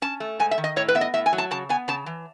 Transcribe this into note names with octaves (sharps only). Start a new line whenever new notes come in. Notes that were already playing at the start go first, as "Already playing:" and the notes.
C#4 A5
A3
G#2 G#5
E5
D#3
D#5
A2 C#5
B4
B3 E5
D#5
A2 E5
G#5
F#3
A5
C#3 A5
B3 G#5
C#3 A5
E3